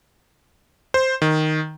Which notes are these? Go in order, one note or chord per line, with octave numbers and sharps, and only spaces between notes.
C5
D#3